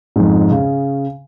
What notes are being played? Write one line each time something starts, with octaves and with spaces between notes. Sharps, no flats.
F2 G#2
C#3